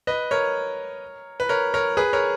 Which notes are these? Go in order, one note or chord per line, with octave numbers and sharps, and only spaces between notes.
B4 D#5
A#4 C#5
B4
A#4 C#5
A#4 C#5
G#4 B4
A#4 C#5